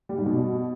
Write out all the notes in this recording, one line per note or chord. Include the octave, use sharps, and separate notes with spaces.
G3
G#2
B2